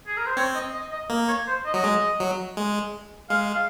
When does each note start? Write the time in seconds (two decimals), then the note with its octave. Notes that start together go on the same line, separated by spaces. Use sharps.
0.07 G#4
0.17 A#4
0.26 C5
0.36 C4 C#5
0.55 D#5
0.73 D#5
0.92 D#5
1.10 A#3
1.28 C#5
1.48 C5
1.66 D#5
1.74 F#3
1.83 G#3
2.20 F#3
2.57 G#3
3.30 G#3 F5
3.54 F5